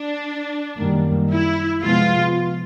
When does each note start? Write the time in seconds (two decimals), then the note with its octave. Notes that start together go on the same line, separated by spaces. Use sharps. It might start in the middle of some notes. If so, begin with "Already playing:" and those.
Already playing: D4
0.79 F#2 D#3 G3 A#3
1.32 E4
1.83 C3 F3 G#3 B3 F4